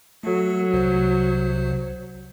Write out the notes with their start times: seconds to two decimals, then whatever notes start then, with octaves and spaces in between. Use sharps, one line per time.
0.23 F#3 A3 A4
0.73 C2 C3 C5